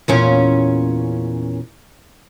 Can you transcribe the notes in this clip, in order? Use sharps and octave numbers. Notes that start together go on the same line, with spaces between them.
E2 A#2 C#4